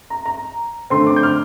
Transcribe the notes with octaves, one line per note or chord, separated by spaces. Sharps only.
A#5
A#5
D3 A3 C4 C6
D6
G6
F6